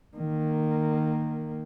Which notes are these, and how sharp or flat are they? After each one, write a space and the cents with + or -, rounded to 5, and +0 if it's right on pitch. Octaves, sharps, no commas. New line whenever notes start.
D#3 -15 A#3 -10